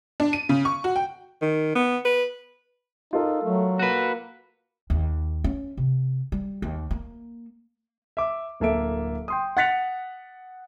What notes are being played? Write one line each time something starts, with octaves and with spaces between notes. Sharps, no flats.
D4
D#7
C#3
C#6
F#4
G5
D#3
B3
B4
D#4 F4 A4 A#4
F#3 A3
A#3 F#4 B4
D#2
C#4
C3
G3
D#2
A#3
E5 D6
D1 A#3 A4 E5 D7
G5 C6 D#6
F#5 F#6 A6 B6 C#7 F7